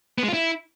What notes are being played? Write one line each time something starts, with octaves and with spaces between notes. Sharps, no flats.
B3
G#3
F4
E4